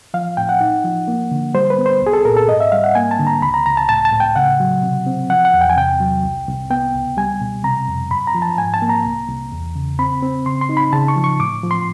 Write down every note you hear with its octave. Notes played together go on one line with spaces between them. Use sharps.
F3 F5
A2 G5
F#5
D#4
F3
A#3
D3
G3 C5
B4
B3
C5
C2 G#4
A4
A#2 A#4
A4
G#2 D#5
E5
G3 F5
F#5
A#3 G#5
A5
D3
A#5
C#2 B5
A#5
C#2 A#5
A5
A2 A5
A5
A2
G5
C#3 F#5
F#3
C3
C4
F3 F#5
F#5
E2
G5
G#5
C3 G5
F#3
C2
C2
B3 G5
C#2
G3 G#5
B2
C3 A#5
F2
F#2 B5
A#5
F3
A5
G#2 G#5
A5
A#3
A#5
C2
C2
E2
C#3
C4 B5
C4
C#3 C6
C6
D#4
B5
C#3 A5
C#6
F3
C#6
A2 D6
F3
C6